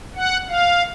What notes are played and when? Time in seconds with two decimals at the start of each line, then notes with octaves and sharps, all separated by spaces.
0.16 F#5
0.49 F5